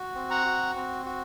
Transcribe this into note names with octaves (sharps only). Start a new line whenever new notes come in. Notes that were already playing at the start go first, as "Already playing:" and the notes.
Already playing: F#4
C4
F#5 A#5
F#4
C4
F#4